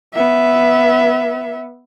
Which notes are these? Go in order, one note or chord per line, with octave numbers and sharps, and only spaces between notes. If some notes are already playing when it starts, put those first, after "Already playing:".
B3 E5